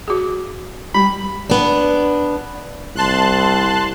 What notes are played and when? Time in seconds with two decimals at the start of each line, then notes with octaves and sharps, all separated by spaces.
0.08 F#4 G#4
0.94 G3 B5
1.50 B3 D4
2.96 C2 A5 C6 F#6